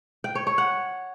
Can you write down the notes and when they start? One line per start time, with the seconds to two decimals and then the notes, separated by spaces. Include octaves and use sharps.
0.24 G5
0.35 C#5
0.47 C#5
0.58 F#5